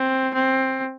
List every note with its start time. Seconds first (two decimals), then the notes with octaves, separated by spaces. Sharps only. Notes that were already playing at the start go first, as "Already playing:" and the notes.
Already playing: C4
0.34 C4